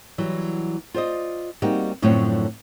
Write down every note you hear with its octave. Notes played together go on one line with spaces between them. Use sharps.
E3 F#3 G3
F4 C5 D5 D#5
G3 A#3 C4 D#4 F#4 G4
F#2 A2 D3 F3 C4 C#5